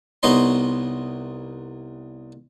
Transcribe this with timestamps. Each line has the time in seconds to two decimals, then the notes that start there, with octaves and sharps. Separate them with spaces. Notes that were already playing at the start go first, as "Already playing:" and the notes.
0.23 C2 B3 D#4 C#5 D#5 C6